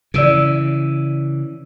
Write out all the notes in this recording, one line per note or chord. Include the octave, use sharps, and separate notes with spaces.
C#3 E3 D5 E6 D7